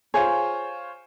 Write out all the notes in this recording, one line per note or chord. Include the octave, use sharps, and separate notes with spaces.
F4 G#4 C5 C#5